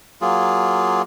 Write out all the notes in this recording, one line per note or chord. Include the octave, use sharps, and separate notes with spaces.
F#3 A#3 F4 G#4